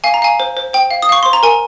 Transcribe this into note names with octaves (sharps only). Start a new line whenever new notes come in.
F5 G#5
A#5
F5 G#5
C5
C5
C5 G5
F5
D#6
F5 C#6
C5 C6
A#5
A#4 G#5